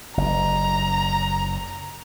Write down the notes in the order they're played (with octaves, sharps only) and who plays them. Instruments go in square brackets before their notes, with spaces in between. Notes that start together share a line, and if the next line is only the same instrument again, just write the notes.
[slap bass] F#1 [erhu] A#5